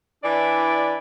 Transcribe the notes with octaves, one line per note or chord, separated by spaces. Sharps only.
E3 D4 E4 D5